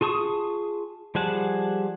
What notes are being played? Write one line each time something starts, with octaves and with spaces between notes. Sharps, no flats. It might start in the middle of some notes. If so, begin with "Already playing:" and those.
F4 G#4 A5 C#6 D#6
F3 G3 G#4 F#5 A5